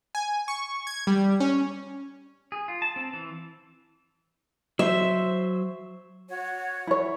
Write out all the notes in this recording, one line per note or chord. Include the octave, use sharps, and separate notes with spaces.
G#5
C#6
G#6
G3
C#4
G#4
F4
A5
C4
E3
F#3 C5 E5
F#4 C#5 F#5
E4 C#5